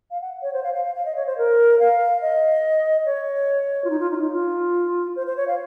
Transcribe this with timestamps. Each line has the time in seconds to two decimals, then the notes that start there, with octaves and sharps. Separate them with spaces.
0.11 F5
0.22 F#5
0.42 C#5
0.53 C5
0.63 F5
0.74 F5
0.85 F5
0.95 F5
1.05 D#5
1.16 C#5
1.26 C5
1.38 A#4
1.79 F5
2.22 D#5
3.06 C#5
3.84 F4
3.90 D#4
4.00 F4
4.11 D#4
4.16 F4
4.21 D#4
4.32 F4
5.16 C5
5.27 C5
5.37 C#5
5.48 F5